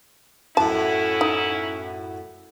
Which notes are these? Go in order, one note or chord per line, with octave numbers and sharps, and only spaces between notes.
F#2 A2 C#4 E4 F#4 A5
D#4